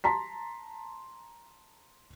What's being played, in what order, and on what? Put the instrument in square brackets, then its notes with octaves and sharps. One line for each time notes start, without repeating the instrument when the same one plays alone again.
[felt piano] A5 A#5 C6 B6